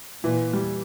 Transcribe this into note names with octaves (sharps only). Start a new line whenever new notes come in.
A#2 E3
G3